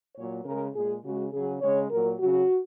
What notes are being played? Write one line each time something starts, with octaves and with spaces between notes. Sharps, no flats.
A#2 F#3 C#5
C#3 G#3 A#4
A#2 G#3 G#4
C#3 G#3 F#4
C#3 F#3 G#4
C#3 G#3 C#5
A#2 F#3 A#4
C#3 F#3 F#4